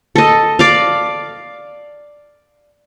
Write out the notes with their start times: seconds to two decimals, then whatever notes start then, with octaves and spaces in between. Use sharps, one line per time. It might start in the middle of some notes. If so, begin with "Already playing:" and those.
0.15 A4 D#5
0.59 D5 F5